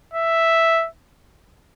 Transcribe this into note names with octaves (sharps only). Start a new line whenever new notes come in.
E5